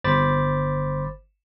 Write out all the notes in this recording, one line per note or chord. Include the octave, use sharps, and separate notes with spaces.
G1 C5 B5 D6 A6